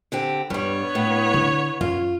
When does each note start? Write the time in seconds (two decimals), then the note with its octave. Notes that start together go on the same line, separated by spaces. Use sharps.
0.12 D3 C4 G4
0.50 G2 G3 B3 D4 C#5
0.95 A2
1.34 D3
1.81 F#2 F4